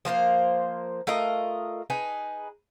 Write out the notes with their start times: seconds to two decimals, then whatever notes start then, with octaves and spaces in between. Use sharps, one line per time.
0.05 F3 A#3 A#4 C5
1.07 A3 F4 A#4 D#5
1.90 D#4 G#4 B4